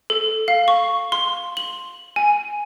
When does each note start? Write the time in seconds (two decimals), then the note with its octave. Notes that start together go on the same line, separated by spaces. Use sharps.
0.10 A4
0.48 F5
0.68 C#6
1.12 C6
1.57 F#7
2.16 G#5